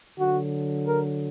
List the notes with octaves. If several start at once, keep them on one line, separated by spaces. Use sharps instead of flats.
D3 F#3 F#4
A#4